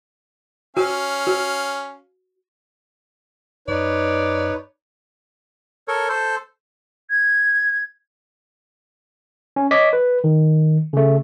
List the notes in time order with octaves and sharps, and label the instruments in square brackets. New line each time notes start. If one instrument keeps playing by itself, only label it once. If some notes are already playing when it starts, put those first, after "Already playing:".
[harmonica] C#4 F5 [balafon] F#4
[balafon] F#4
[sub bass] F#2 [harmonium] D#4 B4 C#5 [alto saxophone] D5
[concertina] A4 A#4 C#5
A4 C5
[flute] G#6
[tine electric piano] C#4
C#5 D#5 D6 B6
B4
D#3
C#3 A3